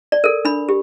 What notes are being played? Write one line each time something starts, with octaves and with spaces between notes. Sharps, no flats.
D5
A4 A#4
D4 B5
G4